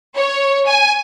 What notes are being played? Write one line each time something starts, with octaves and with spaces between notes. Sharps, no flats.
C#5
G#5